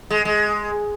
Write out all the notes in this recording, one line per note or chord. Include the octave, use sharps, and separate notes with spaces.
G#3
G#3